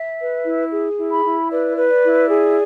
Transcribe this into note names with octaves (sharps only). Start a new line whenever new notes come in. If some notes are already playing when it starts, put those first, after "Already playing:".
Already playing: E5
B4
E4
G#4
E4
B5
E4
B4 D5
B4
D5
E4
G#4